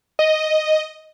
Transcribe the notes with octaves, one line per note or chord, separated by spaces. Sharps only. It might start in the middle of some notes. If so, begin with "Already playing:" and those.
D#5